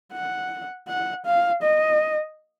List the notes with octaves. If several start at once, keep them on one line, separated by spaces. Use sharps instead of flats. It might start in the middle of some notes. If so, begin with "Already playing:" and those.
F#5
F#5
F5
D#5